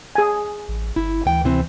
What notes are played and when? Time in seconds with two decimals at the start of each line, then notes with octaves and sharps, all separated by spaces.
0.15 G#4 G#5
0.68 A1
0.96 G1 E4
1.25 D2 E3 G5
1.44 C3 E3 C4